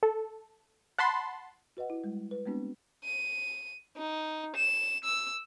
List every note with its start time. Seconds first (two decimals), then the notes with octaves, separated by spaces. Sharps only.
0.03 A4
0.98 F#5 A5 B5 C6
1.77 F#4 B4 D#5 F#5
1.90 E4
2.04 G3 G#3
2.31 B4
2.46 G#3 A3 B3 C4 D4 F#4
3.04 D#7
3.97 D#4
4.56 E7
5.04 E6